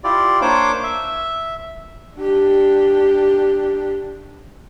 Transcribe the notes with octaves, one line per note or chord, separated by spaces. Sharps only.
E4 F4 G4 D5
A#3 D4 C5 C#5 D6
E5
D4 G4